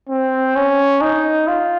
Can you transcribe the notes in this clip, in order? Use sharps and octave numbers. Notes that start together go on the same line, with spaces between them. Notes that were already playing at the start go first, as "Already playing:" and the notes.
C4
C#4
D#4
F4